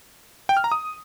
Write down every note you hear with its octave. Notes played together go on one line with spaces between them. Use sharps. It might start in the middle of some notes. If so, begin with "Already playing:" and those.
G5
F6
A#5
D#6